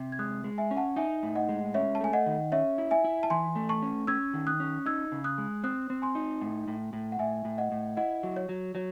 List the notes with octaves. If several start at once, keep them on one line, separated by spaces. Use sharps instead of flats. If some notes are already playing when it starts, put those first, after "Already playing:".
Already playing: C3
G#6
G#3 D#6 F#6
G#3
E5 G#5
C#4
F#5 A5
D#4 E5 G#5
A2
D#5 F#5
G#3
C#4 C#5 E5
A5
A3 G#5
D#5 F#5
D#3
C#4 C#5 E5
E4
E5 G#5
E4
A5
E3 G#5 C6
A3
A5 C#6
C#4
C#4 E6 G#6
D#3
D#6 F#6
C#4
D#4 E6 G#6
C#3
D#6 F#6
G#3
C4 D#6 F#6
C4
G#5 C6
D#4
A2
A2
A2
F#5
A2 E5 G#5
A2
D#5 F#5
A2
E4 D#5 F#5
F#3
C#5
F#3
F#3 C#5